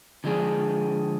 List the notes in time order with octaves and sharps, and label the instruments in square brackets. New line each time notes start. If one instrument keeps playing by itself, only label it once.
[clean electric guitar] D3 F3 G#3 D4 G#4